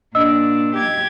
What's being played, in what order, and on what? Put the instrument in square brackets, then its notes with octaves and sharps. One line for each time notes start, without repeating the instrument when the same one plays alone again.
[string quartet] A#2 D4 [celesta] D#5 E6
[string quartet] G4 G#6